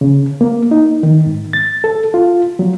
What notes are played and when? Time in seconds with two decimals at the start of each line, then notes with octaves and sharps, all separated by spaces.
0.01 C#3
0.41 A#3
0.71 D#4
1.03 D#3
1.26 G#2
1.53 A6
1.84 A4
2.14 F4
2.59 F#3